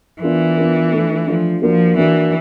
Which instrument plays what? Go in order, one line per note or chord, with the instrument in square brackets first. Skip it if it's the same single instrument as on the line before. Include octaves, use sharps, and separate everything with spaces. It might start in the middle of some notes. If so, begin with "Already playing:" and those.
[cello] E3 [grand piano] B3 D4 F4 A#4
[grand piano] B3 D4 F4 A#4
A3 D4 F4
[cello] F3 [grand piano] A3 D4 F4
[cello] F3 [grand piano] A#3 D4 F#4
[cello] E3 [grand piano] A#3 D4 F#4